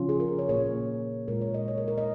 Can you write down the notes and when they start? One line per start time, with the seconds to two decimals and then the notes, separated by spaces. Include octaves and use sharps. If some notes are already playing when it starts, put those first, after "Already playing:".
Already playing: C#3 F3 C#4 F4
0.09 G#4
0.20 A#4
0.39 C#5
0.49 A#2 A#3 F4 C#5
1.28 A#2 G#3 F4 A#4
1.41 C#5
1.54 D#5
1.68 C#5
1.78 A#4
1.88 A#4
1.98 D#5